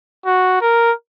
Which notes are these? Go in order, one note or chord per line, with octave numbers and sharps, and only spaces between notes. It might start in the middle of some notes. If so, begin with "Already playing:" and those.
F#4
A#4